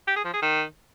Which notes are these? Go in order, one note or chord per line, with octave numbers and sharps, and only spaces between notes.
G4
G#4
F3
G#4
D#3